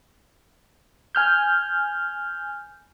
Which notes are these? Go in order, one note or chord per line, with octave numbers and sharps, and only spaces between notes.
G#5 F6 G6